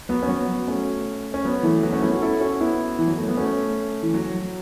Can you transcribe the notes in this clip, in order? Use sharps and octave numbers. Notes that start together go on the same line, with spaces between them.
F#3 B3
C#4
F#3 B3
A3 C#4
C#4
F#3 B3
E3 A3
F#3 B3
A3 C#4
B3 E4
C#4 F#4
E4 A4
C#4 F#4
B3 E4
E3
F#3
A3
B3
A3 C#4
E3
F#3